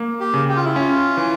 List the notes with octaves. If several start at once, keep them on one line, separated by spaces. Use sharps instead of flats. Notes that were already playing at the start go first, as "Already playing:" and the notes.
Already playing: A#3
G4
C#3
G4
F4
E4
C#4 F4
E3